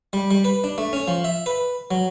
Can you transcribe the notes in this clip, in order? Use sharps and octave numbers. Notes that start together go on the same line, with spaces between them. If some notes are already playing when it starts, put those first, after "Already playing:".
G3
G3
B4
D4
A3
C#4
F3
E5
B4
F#3